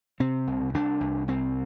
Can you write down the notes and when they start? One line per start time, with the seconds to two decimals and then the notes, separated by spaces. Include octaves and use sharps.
0.20 C3 C4
0.47 C2
0.74 C2 D4
1.01 C2
1.28 C2 C4